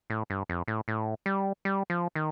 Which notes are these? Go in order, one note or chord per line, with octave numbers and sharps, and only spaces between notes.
A2
G2
F2
A2
A2
G3
G3
F3
D#3